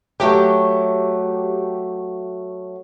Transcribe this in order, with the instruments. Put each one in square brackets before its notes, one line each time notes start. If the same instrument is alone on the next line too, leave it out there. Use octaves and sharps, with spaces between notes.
[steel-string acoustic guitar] F#3 A3 [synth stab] G4